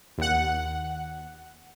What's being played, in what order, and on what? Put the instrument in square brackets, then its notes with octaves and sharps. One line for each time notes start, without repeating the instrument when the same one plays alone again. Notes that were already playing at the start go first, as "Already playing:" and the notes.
[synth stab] D#2 F#5